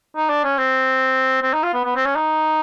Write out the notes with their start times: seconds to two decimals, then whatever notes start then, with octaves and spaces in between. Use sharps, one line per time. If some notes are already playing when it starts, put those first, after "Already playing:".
0.16 D#4
0.29 D4
0.44 C#4
0.58 C4
1.42 C4
1.53 D#4
1.63 F4
1.74 B3
1.85 B3
1.96 C4
2.05 C#4
2.16 D#4